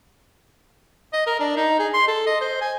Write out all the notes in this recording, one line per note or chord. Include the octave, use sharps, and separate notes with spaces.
D#5
A#4
D4
D#4
G#4
C6
A4
D#5
C5
G#5